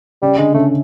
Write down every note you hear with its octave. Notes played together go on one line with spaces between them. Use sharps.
C#3 G3
D3 G#3
C#3 A3